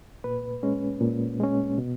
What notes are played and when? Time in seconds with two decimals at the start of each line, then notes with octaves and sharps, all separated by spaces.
0.24 A#2 B4
0.63 G#3 C#4
1.01 A#2
1.40 G#3 C#4
1.78 B2